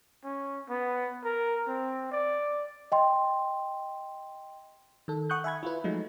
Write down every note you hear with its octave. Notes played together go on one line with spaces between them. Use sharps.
C#4
B3
A#4
C4
D5
D#5 G5 C6
D#3 A4
F#5 C#6 D#6 F#6 G6
E5 G#5 B5 G#6
E4 F4 B4
F3 F#3 G#3 A3 D#4